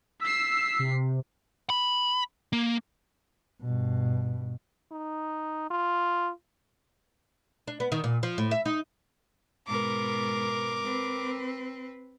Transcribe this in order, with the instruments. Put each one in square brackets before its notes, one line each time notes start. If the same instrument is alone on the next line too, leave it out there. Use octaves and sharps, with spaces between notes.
[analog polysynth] E6 [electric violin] B6 C7
[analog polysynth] C3
[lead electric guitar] B5
A#3
[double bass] G2 B2
[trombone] D#4
F4
[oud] D4
B3
D#3
A#2
F3
A2
E5
D#4
[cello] G#2 B2 [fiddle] A#4 D6
[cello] C4 B4